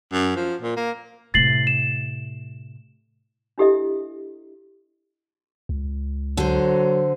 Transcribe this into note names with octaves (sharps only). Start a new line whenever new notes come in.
F#2
F3
A#2
A#3
A2 C3 A6 C7 F#7
E7
D4 E4 G4 A4 D#5 E5
C#2
D3 F#3 C5